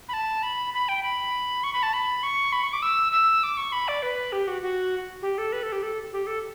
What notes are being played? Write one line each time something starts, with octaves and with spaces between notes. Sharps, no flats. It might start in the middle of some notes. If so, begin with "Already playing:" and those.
B5
A5
B5
B5
G5
B5
C#6
B5
A5
B5
C#6
B5
C#6
D6
E6
E6
D6
C#6
B5
D5
B4
G4
F#4
F#4
G4
A4
B4
A4
G4
A4
G4
A4